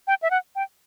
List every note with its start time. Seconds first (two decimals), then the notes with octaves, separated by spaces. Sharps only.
0.07 G5
0.22 E5
0.31 F#5
0.56 G5